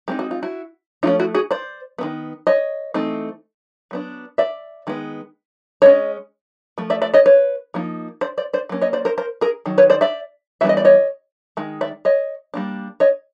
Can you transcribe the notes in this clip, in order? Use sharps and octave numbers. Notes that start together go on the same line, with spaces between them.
G#3 C4 D#4 G4
F#4
F4
E4 F#4
F3 A3 C#4 D#4 F4
E4 F#4
F#4 G#4
C5 D5
D#3 F#3 B3
C#5 D#5
E3 A3 C4 D#4
F#3 B3 D4
D5 E5
D#3 G#3 B3
G#3 C#4 C#5 D#5
F3 A3
D5 E5
D5 E5
C#5 D#5
B4 C#5
F3 A#3 D#4
C5 D5
C5 D5
C5 D5
F#3 A#3 C#4
C#5 D#5
C5 D5
A#4 C5
A#4 C5
G#4 A#4
D#3 F#3
B4 C#5
C5 D5
D5 E5
E3 G3 B3 D4 E5
D#5
D5
C#5 D#5
D#3 G#3
D5 E5
C#5 D#5
G3 A#3 D4
C#5 D#5